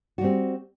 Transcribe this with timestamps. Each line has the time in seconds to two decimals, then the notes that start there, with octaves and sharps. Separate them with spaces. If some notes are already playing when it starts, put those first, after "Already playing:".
0.18 F#4
0.21 G3
0.24 C4